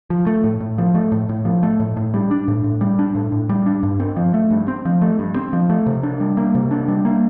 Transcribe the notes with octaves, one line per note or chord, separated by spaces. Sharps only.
F3
A3
A2
A2
F3
A3
A2
A2
F3
A3
A2
A2
G3
D4
A2
A2
G3
D4
A2
A2
G3
D4
G2
C4
F3
A3
G2
C4
F3
A3
G2
C4
F3
A3
C3
D4
G3
A#3
C3
D4
G3
A#3